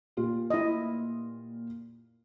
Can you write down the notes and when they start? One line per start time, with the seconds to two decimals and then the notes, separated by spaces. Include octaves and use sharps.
0.17 A#2 F4 G4
0.50 E4 D#5